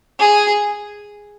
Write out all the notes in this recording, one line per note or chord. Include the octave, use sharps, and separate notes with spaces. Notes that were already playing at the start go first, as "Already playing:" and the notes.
G#4